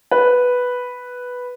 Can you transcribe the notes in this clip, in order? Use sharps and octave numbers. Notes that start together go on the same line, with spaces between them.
B4